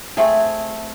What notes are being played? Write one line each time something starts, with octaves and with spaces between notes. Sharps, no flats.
A3 C4 G#4